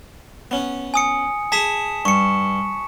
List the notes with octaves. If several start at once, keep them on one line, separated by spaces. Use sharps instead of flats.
B3 C#4
G#5 D#6 C#7
G#4 G#5 A5 B6 E7
G2 C#6 C#7